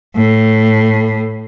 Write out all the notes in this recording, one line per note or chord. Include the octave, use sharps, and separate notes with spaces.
A2